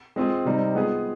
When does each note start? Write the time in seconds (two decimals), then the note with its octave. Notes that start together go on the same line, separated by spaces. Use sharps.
0.16 G#3 C4 F4 G#4
0.45 C3 G3 C4 D#4
0.75 G#3 B3 F4 G#4